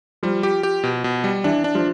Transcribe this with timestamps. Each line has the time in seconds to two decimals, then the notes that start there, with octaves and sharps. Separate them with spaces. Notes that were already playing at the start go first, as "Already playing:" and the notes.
0.23 F3 G3
0.43 G4
0.63 G4
0.84 B2
1.04 B2
1.24 G3
1.44 E3 D4
1.64 D4
1.75 F3